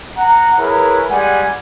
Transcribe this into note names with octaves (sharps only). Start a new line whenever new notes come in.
F#5 A#5
E4 G#4 A#4 B4 C#5
G3 G#3 F#5 G#5